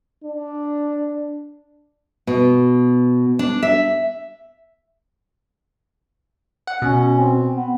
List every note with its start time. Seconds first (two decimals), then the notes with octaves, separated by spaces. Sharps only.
0.24 D4
2.27 B2
3.39 D4
3.62 E5
6.67 F#5
6.82 B2 C#4
7.19 C4
7.56 B3